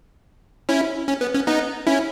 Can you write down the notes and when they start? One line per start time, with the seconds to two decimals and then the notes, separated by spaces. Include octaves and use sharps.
0.69 C#4 E4
1.08 C#4
1.21 B3
1.35 C#4
1.47 B3 D#4
1.87 C#4 E4